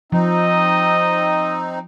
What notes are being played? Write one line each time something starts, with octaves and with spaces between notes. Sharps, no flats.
F3 C4 D#4 D#5